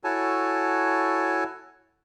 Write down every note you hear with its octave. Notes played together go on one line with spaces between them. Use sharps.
E4 F#4 A4 C#5 G#5 A5